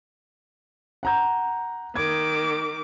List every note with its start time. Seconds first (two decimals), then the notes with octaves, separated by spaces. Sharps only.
1.03 F#5 A#5 G6
1.96 D#3 D6 G#6